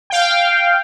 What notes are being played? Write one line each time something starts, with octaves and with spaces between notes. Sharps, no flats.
F5 G5